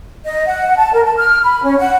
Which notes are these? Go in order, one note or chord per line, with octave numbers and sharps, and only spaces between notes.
D#5
F#5
A5
A#4
A5
F6
B5
C#4
F#5